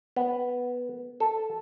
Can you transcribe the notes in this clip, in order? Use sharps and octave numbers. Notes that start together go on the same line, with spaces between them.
B3
A4